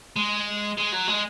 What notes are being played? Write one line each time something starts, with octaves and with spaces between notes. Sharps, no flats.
G#3
G#3
F#3
G#3